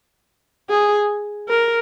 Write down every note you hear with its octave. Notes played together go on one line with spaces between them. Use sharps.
G#4
A#4